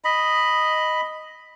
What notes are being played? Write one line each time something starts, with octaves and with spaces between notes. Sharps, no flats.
D#5 B5